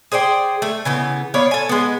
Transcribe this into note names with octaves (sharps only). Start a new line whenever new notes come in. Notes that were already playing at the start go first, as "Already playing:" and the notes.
G#4 C5 D5 G5
A3
C#3 E3 B3
B3 C#5 D5 F5
A4 G#5
G#3 B3